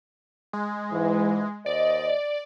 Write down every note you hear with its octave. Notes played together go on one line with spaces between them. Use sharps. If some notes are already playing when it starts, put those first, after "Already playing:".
G#3
G#2 E3
D#2 C5 D5 D#5
D5